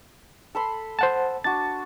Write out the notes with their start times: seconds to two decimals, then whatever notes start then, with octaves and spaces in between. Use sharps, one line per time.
0.55 A4 B5 C6
0.99 C5 F#5 A5
1.44 D4 F#4 A6